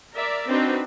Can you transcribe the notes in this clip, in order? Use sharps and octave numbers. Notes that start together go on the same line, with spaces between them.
A#4 D5 E5
C4 D4 D#4 F#4 B4